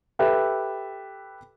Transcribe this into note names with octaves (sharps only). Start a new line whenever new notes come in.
G4 A4 B4 E5